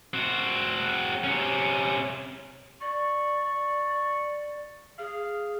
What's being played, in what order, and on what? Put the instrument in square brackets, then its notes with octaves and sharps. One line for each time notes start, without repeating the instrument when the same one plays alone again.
[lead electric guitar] C4 F#4
C3 C#4
[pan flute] D5 [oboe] C#6
[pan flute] G#4 [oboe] F5